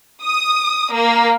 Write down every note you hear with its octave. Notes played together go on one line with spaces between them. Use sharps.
D#6
A#3